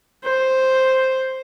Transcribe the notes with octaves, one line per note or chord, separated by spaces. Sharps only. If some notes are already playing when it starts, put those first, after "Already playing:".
C5